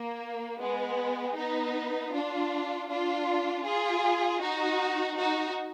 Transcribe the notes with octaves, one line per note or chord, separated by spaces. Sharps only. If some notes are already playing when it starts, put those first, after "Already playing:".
Already playing: A#3
G#3 B3
B3 D#4
D4 F4
D4 F4
F4 G#4
D#4 F#4
D#4 F#4